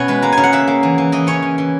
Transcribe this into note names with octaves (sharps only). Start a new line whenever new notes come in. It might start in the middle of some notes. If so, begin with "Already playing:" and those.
Already playing: B2 C#4 C#5 E5 F#5 G#5
G#3 B4
A#3 A#5
C#3 G#5
F#5
A#3 E5
A#3
E3
E3
E3 D#5
C#4 C#5
E3
E3